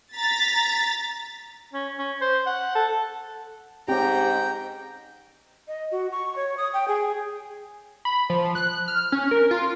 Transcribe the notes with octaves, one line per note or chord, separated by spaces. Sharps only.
A#5 A6 B6
C#4
C#4
C5
F#5
A4
G#2 C4 C#4 G4 G5 A#5
D#5
F#4
C#6
C#5
D#6
G5
G#4
B5
F3
F#6
F6
C#4
A#4
F4